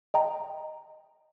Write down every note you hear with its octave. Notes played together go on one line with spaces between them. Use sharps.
D#5 G5 A#5